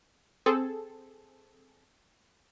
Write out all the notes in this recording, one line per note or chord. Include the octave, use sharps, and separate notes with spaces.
C4 G#4 A4